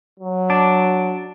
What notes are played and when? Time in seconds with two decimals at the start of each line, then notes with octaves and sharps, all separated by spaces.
0.20 F#3
0.50 D4